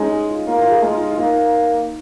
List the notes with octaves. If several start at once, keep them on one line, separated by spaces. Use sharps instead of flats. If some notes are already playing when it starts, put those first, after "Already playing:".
Already playing: G#3 C#4 D#4
G#4
F4
A#3 F4
F4
G#4
G#3
F4
D#4
F4
A#3 D#4